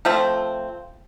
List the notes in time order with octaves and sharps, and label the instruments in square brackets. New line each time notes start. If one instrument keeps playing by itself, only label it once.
[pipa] F3 A3 C4